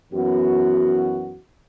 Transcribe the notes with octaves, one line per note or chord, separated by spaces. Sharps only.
F#2 E3 B3 F#4